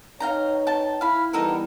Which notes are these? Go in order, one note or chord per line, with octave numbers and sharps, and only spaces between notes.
D#4 B4 C#5 F5 G5 A#5
G5 A5
E4 F5 B5
E3 G3 B3 D#4 A4 A#4